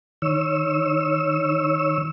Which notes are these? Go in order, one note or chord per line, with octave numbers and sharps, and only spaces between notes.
D#3 C#5 E6